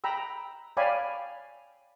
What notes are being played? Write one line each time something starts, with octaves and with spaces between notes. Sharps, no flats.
G5 A#5 B5 E6
C#5 D5 F5 G5 G#5 B5